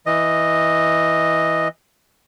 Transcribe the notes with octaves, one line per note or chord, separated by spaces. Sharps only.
E3 D#5